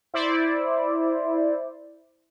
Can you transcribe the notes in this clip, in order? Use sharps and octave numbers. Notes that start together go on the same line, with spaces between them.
E4 C5 D5